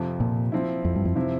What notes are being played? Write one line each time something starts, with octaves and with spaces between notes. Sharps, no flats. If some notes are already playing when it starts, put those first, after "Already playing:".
Already playing: F2 C3 F3
A#2
F3 C4 E4
F2
G2
F2
C3 F3 C4 E4